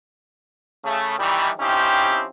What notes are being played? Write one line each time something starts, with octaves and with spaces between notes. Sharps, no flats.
C#3 A3
D#3 E3 G3
F3 C4 C#4 D#4 E4 G4